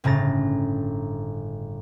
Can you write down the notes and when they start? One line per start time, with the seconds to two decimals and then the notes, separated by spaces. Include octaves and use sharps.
0.04 G1 A2 C#3 A#5 A6